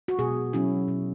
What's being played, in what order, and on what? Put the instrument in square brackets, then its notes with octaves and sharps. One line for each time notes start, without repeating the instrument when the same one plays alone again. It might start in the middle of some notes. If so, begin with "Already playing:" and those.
[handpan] F#4
B2 G#4
F#3 C#4 E4
B2